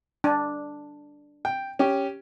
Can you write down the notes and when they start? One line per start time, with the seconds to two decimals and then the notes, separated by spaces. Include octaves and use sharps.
0.24 D4
1.45 G5
1.79 C#4 G4